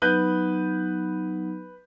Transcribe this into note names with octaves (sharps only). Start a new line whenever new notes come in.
F#3 B3 D#4 B4 F#6 G6